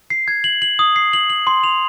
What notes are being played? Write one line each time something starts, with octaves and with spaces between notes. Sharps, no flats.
C7
G#6
F#7
F#7
D#6
C7
F#7
F#7
C6
F7